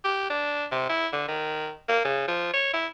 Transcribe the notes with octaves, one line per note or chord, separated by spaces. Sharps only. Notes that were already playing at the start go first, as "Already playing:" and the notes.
G4
D4
C3
E4
D3
D#3
A#3
C#3
F3
C#5
E4